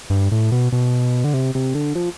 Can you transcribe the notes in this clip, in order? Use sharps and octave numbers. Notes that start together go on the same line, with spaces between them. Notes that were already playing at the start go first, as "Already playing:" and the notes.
G2
A2
B2
B2
D3
C3
C3
D3
F3